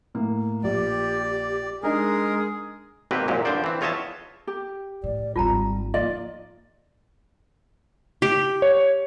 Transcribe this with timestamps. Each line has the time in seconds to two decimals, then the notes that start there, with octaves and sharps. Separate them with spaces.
0.15 A2 A#3
0.63 A#1 G4 D5
1.83 G#3 D4 D#4 G#4 A#4
3.11 G#1 B2 A#3 C4 G4 B4
3.28 C2 F#2 A#2 G#3
3.45 G2 D3 F3 C5 D5
3.64 E3 C4
3.81 E2 F4 C#5 D#5 E5 A5
4.47 G4
5.04 A2 D5
5.36 G#1 D2 G3 F4 A5 A#5
5.94 F3 A#3 D#4 F4 D5 D#5
8.22 G4
8.62 C#5